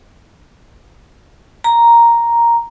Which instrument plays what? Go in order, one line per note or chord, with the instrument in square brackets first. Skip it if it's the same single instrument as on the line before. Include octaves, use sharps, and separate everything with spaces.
[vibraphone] A#5